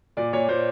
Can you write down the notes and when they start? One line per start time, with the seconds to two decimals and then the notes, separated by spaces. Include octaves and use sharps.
0.17 A#2 D5
0.33 A#2 C#5
0.48 A#2 C5